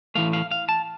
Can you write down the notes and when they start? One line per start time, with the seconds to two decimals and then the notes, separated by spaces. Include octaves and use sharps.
0.15 A2 E3 A3 F5
0.33 F5
0.51 F5
0.69 A5